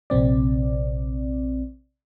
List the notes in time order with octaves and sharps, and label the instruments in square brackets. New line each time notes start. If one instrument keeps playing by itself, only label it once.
[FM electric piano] A#1 C3 C4 D5